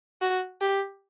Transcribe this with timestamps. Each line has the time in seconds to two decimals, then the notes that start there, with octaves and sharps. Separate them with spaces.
0.22 F#4
0.61 G4